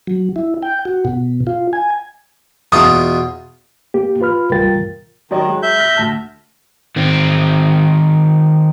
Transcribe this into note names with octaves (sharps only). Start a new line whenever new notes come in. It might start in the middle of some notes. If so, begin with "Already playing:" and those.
F#3
E4
G5
F#4
B2
F4
G#5
E2 B2 F4 D#6
A#3 G4
F4 B4 B5 F6
C2 G3 F4 A#4 G5 A6
D#3 F#3 D5 D#5
F#3 G#3
E5 G6
F6 A#6 B6
D2 A5 F6
D#3 C4